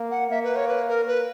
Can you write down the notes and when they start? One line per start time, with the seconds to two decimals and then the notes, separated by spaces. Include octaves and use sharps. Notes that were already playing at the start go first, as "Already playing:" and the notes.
Already playing: A#3
0.11 F#5
0.30 A#3 E5
0.44 B4
0.56 C#5
0.69 B4
0.88 A#4
1.07 B4